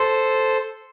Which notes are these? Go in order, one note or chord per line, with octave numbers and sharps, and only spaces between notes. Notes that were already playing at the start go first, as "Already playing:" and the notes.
Already playing: A4 C5